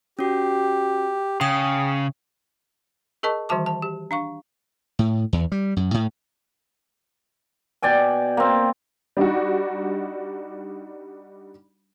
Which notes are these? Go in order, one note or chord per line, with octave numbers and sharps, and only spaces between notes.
C#4 F#4 G4
C#3 G5 D#6
G#4 A#4 D#5 A5 C#6
D#3 E3 G3 F#4 A5 D6
A5
G4
D4 F5 C#6
A2
E2
G3
F#2
A2
B2 D5 G5 G#5
A#3 C4
G3 D4 D#4 F#4